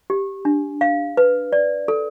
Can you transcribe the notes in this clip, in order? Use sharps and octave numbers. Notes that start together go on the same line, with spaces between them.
G4
D4
F5
B4
D5
A4